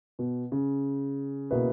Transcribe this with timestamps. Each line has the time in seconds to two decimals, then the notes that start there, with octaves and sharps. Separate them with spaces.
0.19 B2
0.52 C#3
1.51 B2 A#3 E4 B4